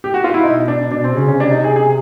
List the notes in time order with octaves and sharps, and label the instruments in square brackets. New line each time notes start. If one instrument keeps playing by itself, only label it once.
[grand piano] G4
F#4
F4
E4
[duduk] B2 [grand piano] D#4
[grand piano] D4
[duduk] B2 [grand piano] D4
[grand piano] C4
[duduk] C#3 [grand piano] C#4
[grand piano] C#4
[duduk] C#3
[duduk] C3 [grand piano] D4
[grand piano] D#4
G#4
G#4